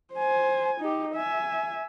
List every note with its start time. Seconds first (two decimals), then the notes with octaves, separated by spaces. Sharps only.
0.14 C5 G#5
0.81 D#4 G4
1.15 E5 G#5